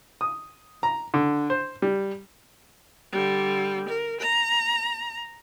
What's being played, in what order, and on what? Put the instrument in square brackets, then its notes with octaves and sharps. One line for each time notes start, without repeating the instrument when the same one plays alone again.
[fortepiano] D#6
A#5
D3
C5
G3
[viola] D3 G3
A#4
A#5